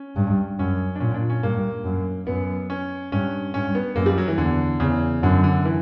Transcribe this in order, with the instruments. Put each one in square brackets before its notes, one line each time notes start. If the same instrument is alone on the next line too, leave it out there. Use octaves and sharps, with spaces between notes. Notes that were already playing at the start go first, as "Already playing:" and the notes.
Already playing: [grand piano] C#4
[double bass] G2
[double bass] F#2 [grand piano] C#4
[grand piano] D4
[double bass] A#2 [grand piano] C#4
[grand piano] D4
C#4
[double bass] G2 [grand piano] A#3
[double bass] F#2
[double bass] F#2 [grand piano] B3
[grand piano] C#4
[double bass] G2 [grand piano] C#4
[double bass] G2 [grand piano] C#4
[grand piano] B3
[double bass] F#2 [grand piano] A#3
[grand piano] G3
F#3
E3
[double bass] E2 [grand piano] D3
[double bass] E2 [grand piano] C#3
[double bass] F#2 [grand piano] D3
[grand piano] D3
E3